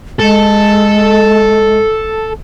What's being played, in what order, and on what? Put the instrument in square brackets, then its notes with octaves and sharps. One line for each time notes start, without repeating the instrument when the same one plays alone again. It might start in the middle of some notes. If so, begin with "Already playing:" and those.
[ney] G#3 [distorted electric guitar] A4